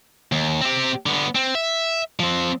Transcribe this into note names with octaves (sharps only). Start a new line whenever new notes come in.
D#2
C4 G4
D3 B3
C4
E5
F3 C4